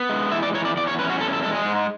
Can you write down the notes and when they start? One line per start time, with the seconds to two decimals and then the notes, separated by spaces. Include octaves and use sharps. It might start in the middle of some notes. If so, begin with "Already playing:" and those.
Already playing: B3
0.09 G#3
0.32 E3 E5
0.43 D5
0.54 E3 C#5
0.65 D5
0.77 E2 D5
0.88 C#5
0.99 C#4 B4
1.10 F#4
1.21 E2 A4
1.33 A4
1.43 G#3 A4
1.55 G#4
1.65 G#2